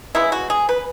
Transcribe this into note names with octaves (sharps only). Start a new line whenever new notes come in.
C#3 G#3 B3 E4
F#4
G#4
B4